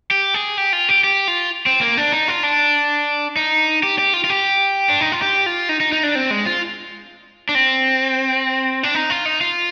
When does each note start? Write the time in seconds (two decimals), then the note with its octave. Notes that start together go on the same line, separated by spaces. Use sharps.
0.11 G4
0.34 G#4
0.58 G4
0.73 F4
0.89 G4
1.04 G4
1.28 F4
1.66 C4
1.81 A#3
1.97 D4
2.12 D#4
2.28 F4
2.43 D4
3.36 D#4
3.83 G4
3.98 G4
4.14 F4
4.24 F4
4.30 G4
4.89 D4
5.01 D#4
5.12 F4
5.22 G4
5.46 F4
5.69 D#4
5.80 D#4
5.92 D#4
6.03 D4
6.15 C4
6.31 G#3
6.46 F4
7.49 D4
7.55 C4
8.83 D4
8.95 D#4
9.10 F4
9.26 D#4
9.41 F4